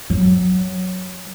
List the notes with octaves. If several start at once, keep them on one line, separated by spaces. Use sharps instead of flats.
F#3